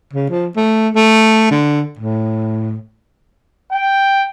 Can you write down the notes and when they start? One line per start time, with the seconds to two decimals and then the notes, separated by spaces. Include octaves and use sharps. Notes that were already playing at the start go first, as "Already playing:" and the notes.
0.14 C#3
0.30 F3
0.57 A3
0.96 A3
1.51 D3
1.99 A2
3.71 G5